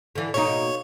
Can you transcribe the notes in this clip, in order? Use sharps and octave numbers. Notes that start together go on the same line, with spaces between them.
D3 E3
B2 A#3 D#4 C#5